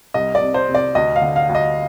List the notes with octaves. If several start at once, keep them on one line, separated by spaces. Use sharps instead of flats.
C2 D#5
D5
C3
C5
C3
D5
D2 D#5
F5
D3
F5
D2
D#5